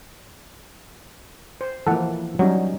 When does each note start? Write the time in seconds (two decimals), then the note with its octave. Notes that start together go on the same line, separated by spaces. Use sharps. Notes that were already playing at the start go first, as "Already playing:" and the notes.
1.61 C5
1.87 E3 F3 A#3 A4 F#5
2.39 F#3 G3 C#4 D#4